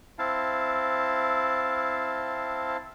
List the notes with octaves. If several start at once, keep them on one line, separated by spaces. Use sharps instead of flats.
C4 E4 F5 A5